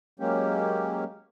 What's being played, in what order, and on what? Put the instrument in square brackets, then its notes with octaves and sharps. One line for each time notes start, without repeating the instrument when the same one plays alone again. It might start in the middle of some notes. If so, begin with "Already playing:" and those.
[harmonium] F#3 G#3 A#3 C#4 G4